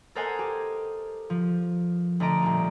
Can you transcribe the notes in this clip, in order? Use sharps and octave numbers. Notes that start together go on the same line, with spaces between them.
A4 A#4 C5 D#5 F#5 G#5
G4
F3
D2 A3 D#5 A#5 D7
C2 A#2